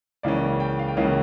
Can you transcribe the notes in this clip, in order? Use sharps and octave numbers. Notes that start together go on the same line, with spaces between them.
C#2 C#3 E3 A#3 C#4 D5
G5
F5
G5
C#2 C#3 E3 A#3 C#4 F5